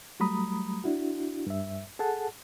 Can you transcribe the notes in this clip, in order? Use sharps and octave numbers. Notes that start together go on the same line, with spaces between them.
F#3 G3 A3 A#5 B5 D#6
D4 E4 F#4
G2 E5
G#4 A4 F#5 A5